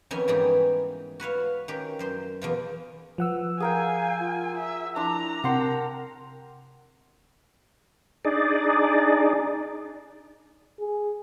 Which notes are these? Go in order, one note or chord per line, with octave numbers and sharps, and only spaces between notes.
F2 D#3 B3 C#4 E5 G#5
G#2 E3 G3 D#4 G4 G#4
F#4 B4 C#5 F5
D#3 C#4 G4
F#2 C5 C6
E2 B2 F4
F3 B4 F#5 E6
G#4 A#4 F5 G5 G#5
F4
F4 E5
D4 E4 A#5 C6
C3 A#4 F#5 G5 C6
D4 D#4 G#4 D5
G#4